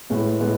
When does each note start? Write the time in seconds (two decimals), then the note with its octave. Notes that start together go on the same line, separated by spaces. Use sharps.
0.10 A2 G#3 B3
0.40 A2 G#3 B3